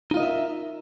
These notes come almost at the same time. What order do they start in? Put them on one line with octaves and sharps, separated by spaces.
D#4 F4 D#5 A#4 E5